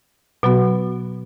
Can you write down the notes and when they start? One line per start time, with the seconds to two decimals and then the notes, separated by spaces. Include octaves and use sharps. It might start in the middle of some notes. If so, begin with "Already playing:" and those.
0.43 B2 F#3 B3 F#4 B4